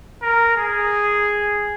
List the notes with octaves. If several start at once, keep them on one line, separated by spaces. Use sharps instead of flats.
A#4
G#4